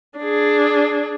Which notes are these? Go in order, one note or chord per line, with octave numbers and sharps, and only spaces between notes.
D4 G#4